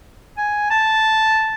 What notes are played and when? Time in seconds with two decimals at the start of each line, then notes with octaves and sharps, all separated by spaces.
0.37 G#5
0.70 A5